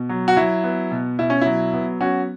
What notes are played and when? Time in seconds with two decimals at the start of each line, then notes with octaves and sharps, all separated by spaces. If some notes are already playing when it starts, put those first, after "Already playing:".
Already playing: B2
0.09 F#3
0.28 F#4
0.36 F#3 E4
0.64 B3
0.91 B2
1.19 B2 E4
1.30 C#4
1.41 F#3 E4
1.74 B3
2.01 F#3 C#4 F#4